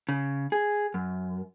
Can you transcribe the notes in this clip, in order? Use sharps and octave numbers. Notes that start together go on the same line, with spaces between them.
C#3
G#4
F#2